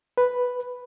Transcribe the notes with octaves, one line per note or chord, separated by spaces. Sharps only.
B4